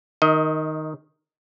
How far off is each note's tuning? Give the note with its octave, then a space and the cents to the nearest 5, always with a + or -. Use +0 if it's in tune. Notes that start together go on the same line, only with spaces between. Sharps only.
D#3 +0 D#5 +30